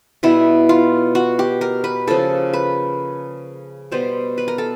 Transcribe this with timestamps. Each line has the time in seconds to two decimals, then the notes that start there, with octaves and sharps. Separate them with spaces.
0.23 B2 G3 B3 E4
0.69 F4
1.15 F#4
1.39 G4
1.61 A#4
1.84 B4
2.07 C#3 F3 A#3 A4
2.53 B4
3.92 B2 G3 B3 C5
4.38 B4
4.48 A#4
4.58 A4